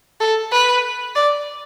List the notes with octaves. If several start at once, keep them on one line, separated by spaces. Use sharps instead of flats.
A4
B4
D5